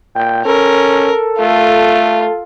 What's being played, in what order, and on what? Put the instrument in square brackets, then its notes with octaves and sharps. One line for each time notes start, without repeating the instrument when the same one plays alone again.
[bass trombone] A#2 [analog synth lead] G5
[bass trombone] C#4 [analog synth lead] A4 [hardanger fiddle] A#4
[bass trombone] A3 [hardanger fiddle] F4